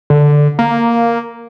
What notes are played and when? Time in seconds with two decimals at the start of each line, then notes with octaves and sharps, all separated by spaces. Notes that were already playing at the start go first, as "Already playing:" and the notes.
0.10 D3
0.59 A#3